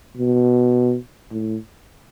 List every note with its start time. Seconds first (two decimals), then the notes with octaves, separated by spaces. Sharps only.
0.17 B2
1.31 A2